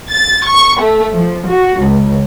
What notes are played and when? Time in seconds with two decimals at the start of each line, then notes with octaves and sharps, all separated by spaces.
0.11 A6
0.46 C#6
0.81 A3
1.14 F3
1.48 F#4
1.84 C#2